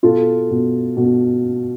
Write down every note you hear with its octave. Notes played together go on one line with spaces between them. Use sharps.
B2 F4 A4
B2
B2